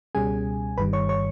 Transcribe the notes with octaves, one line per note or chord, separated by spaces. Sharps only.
C#2 B2 G3 C#4 G#4 G#5
G1 G2 D#3 G3 B4 B5
C#5 C#6
C#5 C#6